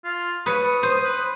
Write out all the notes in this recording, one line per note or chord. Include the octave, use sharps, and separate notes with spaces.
F4
B4 C#5 D#6
C5
B4